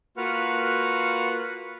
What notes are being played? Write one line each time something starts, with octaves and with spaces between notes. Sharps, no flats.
A#3 F4 F#4 B4 F#5 F6